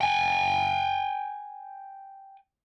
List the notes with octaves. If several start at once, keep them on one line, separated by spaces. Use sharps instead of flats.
G5 G#5